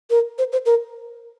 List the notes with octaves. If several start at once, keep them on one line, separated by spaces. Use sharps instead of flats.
A#4
C5
C5
A#4